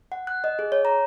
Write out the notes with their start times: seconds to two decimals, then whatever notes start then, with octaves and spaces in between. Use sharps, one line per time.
0.12 F#5
0.27 F#6
0.44 D#5
0.59 G#4
0.72 C#5
0.85 A#5